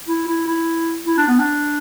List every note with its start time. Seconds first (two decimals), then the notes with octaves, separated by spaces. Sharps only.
0.08 E4
0.27 E4
0.47 E4
1.06 E4
1.18 D4
1.28 B3
1.39 D4